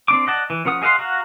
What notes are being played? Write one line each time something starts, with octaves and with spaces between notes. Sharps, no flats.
C4 D4 D6
D5 D#5 F#5 A5
E3
F3 C#4 A#4 F#5 D#6
G#4 D#5 F5 F#5 C6
F#4 F5 F#5 A#5